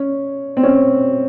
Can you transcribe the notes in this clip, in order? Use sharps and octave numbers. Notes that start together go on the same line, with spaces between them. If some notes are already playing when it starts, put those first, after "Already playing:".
Already playing: C#4
C4
C#4